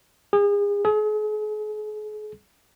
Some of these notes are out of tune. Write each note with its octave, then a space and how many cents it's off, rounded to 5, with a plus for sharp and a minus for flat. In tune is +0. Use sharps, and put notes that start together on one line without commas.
G#4 -35
G#4 +40